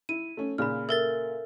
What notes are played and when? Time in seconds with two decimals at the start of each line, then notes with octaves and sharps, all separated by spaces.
0.09 E4 D#7
0.37 A3 C#4
0.58 A#2 C#3 B5 F6
0.89 A4 A#4 E5 A6